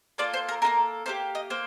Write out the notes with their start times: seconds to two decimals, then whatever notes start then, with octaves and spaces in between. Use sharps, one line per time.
0.18 A#3 F4 A4 D5
0.34 C5
0.49 A#4
0.62 A#3 F4 A4 A#4
1.06 A#3 D#4 G4 C5
1.35 D#5
1.50 A#3 C5